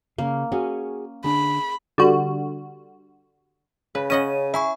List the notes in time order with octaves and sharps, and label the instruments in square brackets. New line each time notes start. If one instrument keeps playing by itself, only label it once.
[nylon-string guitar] C#3 [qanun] A#3 [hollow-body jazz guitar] F5
[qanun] C#4 [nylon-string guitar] F#4 G#4
[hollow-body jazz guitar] D3 D4 [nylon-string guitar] G#4 [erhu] B5
[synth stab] D3 G3 F#4
[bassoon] C#3 [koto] B4
[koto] C#4 D#5 F#5 [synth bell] D#7
[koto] E4 [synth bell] E5 G#5 C#6